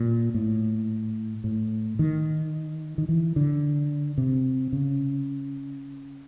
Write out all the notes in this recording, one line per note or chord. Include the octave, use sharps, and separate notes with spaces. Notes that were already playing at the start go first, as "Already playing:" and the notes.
Already playing: A#2
A2
A2
D#3
D#3
E3
D3
C3
C#3